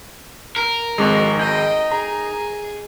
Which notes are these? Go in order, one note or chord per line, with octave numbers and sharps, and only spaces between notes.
A#4
G#1 F2 G#3 D#4 F#4 D#5 D6
D#4 D#5 G5 G6
G#4 A#5